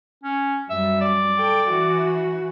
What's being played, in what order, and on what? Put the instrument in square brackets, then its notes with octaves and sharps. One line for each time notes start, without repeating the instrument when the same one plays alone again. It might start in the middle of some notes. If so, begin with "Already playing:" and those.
[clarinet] C#4
[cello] F#2 G3 [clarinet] E5
[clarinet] D5
[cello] A4 G5
E3 F#4